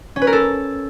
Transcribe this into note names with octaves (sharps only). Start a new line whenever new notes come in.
C#4
B4
A#4
A4